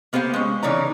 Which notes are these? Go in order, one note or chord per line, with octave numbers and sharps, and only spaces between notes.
A#3 B3 G4 C5 F5
G#3 C#4
C#3 E3 D#4 C#5 D5 A#5